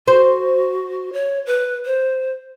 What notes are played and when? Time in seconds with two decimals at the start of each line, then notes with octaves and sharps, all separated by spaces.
0.08 F#4 C5
1.13 C#5
1.46 B4
1.85 C5